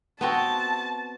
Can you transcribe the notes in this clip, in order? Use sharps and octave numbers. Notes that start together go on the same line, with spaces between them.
B3 C4 F#4 A5